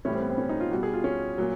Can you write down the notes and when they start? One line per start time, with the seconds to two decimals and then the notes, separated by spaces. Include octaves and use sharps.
0.05 A2 E3 G3 C#4
0.13 C4
0.22 B3
0.30 C4
0.38 C#4
0.49 D#4
0.60 F4
0.71 B2 G3 F#4
0.83 G#4
0.93 F4
1.04 C#4
1.38 A#2 F#3